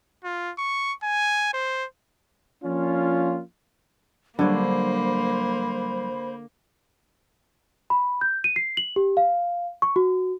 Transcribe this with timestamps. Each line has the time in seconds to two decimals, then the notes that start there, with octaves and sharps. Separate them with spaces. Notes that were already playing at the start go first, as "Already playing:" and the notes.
0.24 F4
0.58 C#6
1.03 G#5
1.54 C5
2.64 F3 A#3 C#4 D4 F4
4.39 D3 F#3 G3 A#3 C5 C#5 B5
7.90 B5
8.21 G6
8.44 D#7
8.56 C7
8.77 F#7
8.96 G4
9.17 F5
9.82 C#6
9.96 F#4